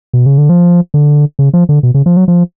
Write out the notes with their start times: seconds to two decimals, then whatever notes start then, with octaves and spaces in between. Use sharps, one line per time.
0.14 B2
0.26 C#3
0.38 D3
0.49 F3
0.94 D3
1.39 C#3
1.54 F3
1.69 D3
1.83 B2
1.94 C#3
2.06 F3
2.17 F#3
2.28 F3